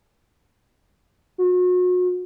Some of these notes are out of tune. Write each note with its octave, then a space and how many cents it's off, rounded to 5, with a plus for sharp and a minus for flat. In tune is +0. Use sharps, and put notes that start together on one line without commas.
F#4 -35